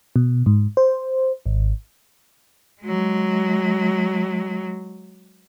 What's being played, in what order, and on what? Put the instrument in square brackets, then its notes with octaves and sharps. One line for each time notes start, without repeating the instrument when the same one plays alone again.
[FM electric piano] B2
G#2
C5
G#1
[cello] F#3 G#3